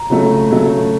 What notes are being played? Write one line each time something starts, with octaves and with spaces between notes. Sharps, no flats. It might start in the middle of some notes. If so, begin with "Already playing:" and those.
Already playing: A#5
C#3 F#3 A3
C#3 F#3 A3